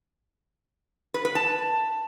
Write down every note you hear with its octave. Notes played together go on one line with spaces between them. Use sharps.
B4
B4
A5